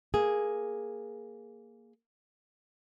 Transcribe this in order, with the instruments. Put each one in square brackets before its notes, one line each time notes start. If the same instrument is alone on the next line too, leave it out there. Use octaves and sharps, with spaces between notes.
[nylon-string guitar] A#3 G#4